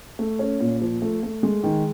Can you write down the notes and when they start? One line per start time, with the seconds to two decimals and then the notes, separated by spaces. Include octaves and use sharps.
0.19 A3
0.39 C#4
0.60 A#2
0.82 F3
1.02 A3
1.23 A3
1.43 G#3
1.64 D#3